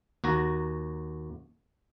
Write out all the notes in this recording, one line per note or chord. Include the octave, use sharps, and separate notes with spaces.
D#2 F#4 A#5